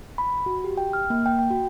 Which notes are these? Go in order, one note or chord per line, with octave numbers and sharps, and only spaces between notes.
B5
F#4
G4
G5
F6
A#3
G5
G5
F#4